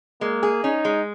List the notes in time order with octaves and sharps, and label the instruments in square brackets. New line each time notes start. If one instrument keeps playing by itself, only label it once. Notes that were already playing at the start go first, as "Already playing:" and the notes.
[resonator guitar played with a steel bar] G#3 [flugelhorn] A#3
[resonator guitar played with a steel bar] G#4
[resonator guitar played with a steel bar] C#4 [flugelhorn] D#4
[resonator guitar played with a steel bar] G#3